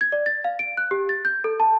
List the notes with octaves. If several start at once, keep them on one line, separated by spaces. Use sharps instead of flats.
G#6
D5
A6
F5
D7
F#6
G4
A6
G6
A4
A5